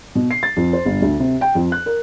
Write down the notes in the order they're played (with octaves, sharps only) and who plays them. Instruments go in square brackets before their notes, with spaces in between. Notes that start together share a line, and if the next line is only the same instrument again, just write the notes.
[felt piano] B2
C7
A6
F2
C5
G1
D2
C3
G5
F2
F#6
A#4